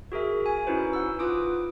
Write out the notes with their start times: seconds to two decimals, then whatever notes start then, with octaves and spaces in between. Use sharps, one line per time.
0.12 F#4 G#4 A#4 E5
0.46 G#5
0.67 C#4 D#4 E4 F#4 B4 C5
0.93 F#5 E6
1.19 F4 B4 D6 D#6 D7